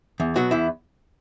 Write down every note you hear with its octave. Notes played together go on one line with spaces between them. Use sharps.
E2
B2 F#3 F#4
E2 E4